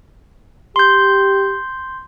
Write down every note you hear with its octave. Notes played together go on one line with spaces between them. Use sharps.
G4 C6 G6